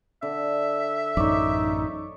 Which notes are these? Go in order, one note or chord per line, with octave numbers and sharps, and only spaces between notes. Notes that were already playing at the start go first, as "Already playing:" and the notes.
D3 E5
A1 F#2 D#4 C#5 D5